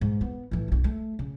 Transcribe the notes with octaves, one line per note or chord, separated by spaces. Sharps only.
G#2
B3
A2 E3
D1 A#1
A3
C#3